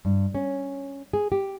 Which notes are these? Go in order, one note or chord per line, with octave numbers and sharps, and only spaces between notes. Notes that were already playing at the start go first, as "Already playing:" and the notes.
G2
C#4
G#4
G4